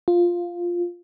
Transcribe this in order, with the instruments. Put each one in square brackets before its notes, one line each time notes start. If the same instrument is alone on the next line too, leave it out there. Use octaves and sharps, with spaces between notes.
[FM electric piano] F4